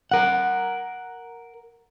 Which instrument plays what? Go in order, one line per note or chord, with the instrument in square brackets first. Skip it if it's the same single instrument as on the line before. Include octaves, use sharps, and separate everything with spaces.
[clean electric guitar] A#4 F#5